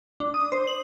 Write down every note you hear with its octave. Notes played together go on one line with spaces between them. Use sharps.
D4
D#6
C5
F#7